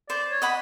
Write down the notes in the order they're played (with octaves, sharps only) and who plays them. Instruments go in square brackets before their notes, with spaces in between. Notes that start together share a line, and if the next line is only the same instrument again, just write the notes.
[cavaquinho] C5 [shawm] D5
[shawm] C#5
[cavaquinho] D#5 F#5 B5